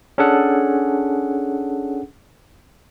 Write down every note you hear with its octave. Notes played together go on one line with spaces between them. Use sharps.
C#4 D4 G#4 A4 F#5